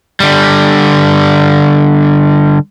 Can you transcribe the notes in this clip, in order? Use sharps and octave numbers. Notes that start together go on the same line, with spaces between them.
D3 G3